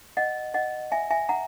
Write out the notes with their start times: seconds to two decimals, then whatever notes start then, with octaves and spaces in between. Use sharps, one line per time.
0.17 D#5 F#5
0.54 D#5 F#5
0.92 E5 G#5
1.10 E5 G#5
1.29 F#5 A#5